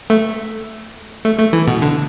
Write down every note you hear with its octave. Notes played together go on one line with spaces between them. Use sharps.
A3
A3
A3
E3
B2
D3